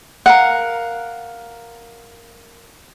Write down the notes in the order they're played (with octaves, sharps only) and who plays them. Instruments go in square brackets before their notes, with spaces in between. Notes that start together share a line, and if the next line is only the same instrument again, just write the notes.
[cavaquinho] A#4 F5 F#5